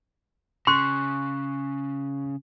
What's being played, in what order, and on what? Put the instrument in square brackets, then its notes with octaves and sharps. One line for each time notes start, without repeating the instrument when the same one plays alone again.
[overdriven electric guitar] C#3 [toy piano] C6 [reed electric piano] C#6 F#6